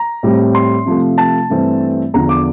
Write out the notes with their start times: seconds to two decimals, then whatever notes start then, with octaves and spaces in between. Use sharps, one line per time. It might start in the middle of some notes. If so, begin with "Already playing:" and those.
Already playing: A#5
0.23 A2 G3 C4
0.55 C6
0.86 C3 F3 A3
1.18 A5
1.50 G2 E3 A3 C4
2.14 E2 D3 F3 A#5
2.29 D6